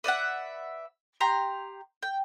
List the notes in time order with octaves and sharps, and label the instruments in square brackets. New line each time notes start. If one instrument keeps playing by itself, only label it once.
[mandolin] B4 D5 E5 F#5
G4 A#5 C6
G5